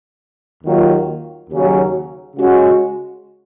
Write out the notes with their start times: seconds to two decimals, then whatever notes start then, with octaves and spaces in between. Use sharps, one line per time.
0.64 D#2 D#3 F#3 A#3 F4
1.50 D#2 C#3 F#3 C#4
2.36 C#3 G#3 C#4 F#4